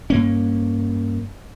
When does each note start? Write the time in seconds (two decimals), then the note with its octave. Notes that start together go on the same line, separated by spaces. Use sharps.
0.10 G2 A#3 C#4